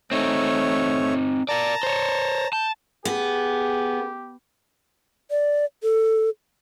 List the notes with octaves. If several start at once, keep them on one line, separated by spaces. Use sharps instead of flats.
A3 C4 D#4 C#5
A#4 D5 A5 A#5
C5 C#5
A5 G6
B3 G4 G#4
D5
A4